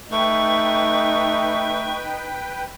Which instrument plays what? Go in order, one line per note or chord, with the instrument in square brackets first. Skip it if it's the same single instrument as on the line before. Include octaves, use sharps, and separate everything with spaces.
[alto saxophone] A3 [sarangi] D#4 [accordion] B4 G5 [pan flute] C#6